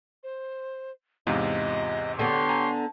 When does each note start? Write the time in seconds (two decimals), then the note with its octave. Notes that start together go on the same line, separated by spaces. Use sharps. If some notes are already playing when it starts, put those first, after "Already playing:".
0.23 C5
1.27 E2 G#2 C3 F4 D#5
2.19 D3 B3 G4 C#5 A5 C6
2.49 G#5 A#5